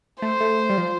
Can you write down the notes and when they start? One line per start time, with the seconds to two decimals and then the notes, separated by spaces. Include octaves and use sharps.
0.22 A3 C5
0.41 A3
0.70 G3
0.78 F3